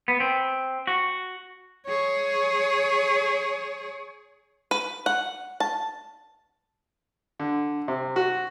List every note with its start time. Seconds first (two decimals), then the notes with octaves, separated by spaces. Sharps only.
0.08 B3
0.20 C4
0.87 F#4
1.86 G#4 C#5
4.71 B4
5.06 F#5
5.60 A5
7.40 D3
7.88 C3
8.16 F#4